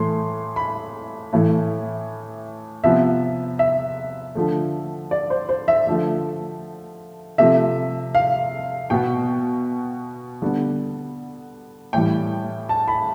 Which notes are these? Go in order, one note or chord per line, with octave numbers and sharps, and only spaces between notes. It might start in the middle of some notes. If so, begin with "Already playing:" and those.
Already playing: A2 E3 A3 C6
B5
A2 E3 A3
C3 F3 B3 E5
E5
D3 F3 A3
D5
C5
C5
E5
D3 F3 A3
C3 F3 A3 E5
F5
B2 B3 G5
D3 G3 B3
A2 E3 G3 G5
A5
B5